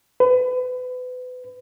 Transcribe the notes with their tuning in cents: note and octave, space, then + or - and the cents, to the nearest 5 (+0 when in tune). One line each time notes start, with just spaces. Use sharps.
B4 +30